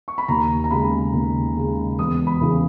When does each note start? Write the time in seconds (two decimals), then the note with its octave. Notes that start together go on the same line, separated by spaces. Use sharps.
0.08 C#6
0.18 B5
0.28 D#2 A#5
0.64 A#5
0.71 C#3 G#3 B5
1.13 D#2
1.56 C#3 G#3
1.99 E1 D#6
2.27 B5
2.41 E2 C#3